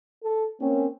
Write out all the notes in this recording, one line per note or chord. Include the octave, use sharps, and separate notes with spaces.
A4
A#3 C4 C#4